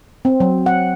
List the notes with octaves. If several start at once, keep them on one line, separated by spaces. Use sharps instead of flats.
C4
F#3
F#5